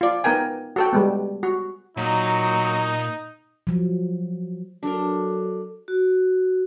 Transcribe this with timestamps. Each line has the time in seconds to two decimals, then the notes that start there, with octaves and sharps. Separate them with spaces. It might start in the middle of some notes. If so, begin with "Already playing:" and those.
0.01 F4 D5
0.24 B3 D#4 A#4 G5 G#5
0.76 F#4 A4 G5
0.93 G3 G#3 B3
1.43 F#4
1.97 A#2 F#3 D#4
3.67 F3 F#3
4.83 F#3 D4 A4 A#4
5.88 F#4